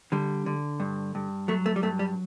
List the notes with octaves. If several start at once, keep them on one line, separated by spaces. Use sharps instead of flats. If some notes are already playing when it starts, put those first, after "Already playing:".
D3 G3
D3
G2
G2
F#3 A3
A3
G3
G2 A3
G3